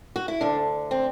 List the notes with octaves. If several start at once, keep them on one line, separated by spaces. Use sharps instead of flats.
F#4
E4
D2 D3 D4
C4